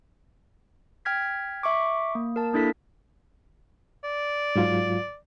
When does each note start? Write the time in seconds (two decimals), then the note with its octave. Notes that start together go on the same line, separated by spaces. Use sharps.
1.05 G5 F6 G#6 B6
1.63 E5 C#6 D6
2.15 A#3
2.36 A#4 A5
2.53 A#3 D4 E4 A4 B6
4.04 D5
4.56 G#2 F#3 F4